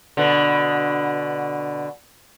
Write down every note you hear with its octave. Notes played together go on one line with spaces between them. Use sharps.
B2 D3